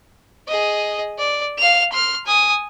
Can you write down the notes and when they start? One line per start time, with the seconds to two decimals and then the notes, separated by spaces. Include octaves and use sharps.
0.48 G#4 D#5
1.18 D5
1.59 F5 F7
1.92 C6 F6
2.26 G#5 D#6